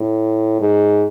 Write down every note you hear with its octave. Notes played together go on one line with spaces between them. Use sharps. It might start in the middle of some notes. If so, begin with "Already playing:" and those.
Already playing: A2
G#2